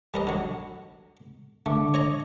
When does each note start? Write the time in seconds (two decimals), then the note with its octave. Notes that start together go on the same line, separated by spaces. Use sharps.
0.14 G3 A#4 D#5
0.27 D3 F#3
1.66 D3 A3 D6
1.94 C#5 D#5 A#5